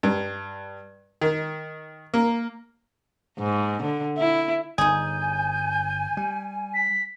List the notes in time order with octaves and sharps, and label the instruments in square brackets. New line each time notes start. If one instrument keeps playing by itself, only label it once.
[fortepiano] G2
D#3
A#3
[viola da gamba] G#2
D3
E4
[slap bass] G1 [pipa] D#4 G#4 [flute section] G#5 [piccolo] G6
[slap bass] G3
[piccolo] B6